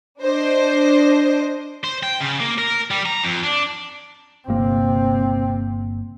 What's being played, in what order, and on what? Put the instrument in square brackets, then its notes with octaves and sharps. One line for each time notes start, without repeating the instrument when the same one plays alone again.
[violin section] D4 C5 D#5
[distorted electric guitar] C5
G5
C#3
A#3
A#4
G3
A#5
F2
D4
[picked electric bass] G1 A#3 [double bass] C3 C4